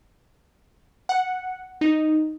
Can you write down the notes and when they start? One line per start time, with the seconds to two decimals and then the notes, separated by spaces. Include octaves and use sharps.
1.09 F#5
1.81 D#4